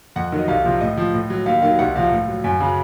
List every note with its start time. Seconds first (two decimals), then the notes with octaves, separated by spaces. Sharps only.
0.16 F2 F#5
0.32 D#3 F#3
0.39 D#5
0.48 C2 F5
0.64 C3 F3
0.81 A2 D#5
0.97 F3
1.14 A2
1.30 F#3
1.46 D#2 F5
1.62 D#3 F#3 F5
1.79 C2 F#5
1.96 C3 F3 F5
2.12 A2
2.28 F#3
2.44 F#2
2.60 C#3 F#3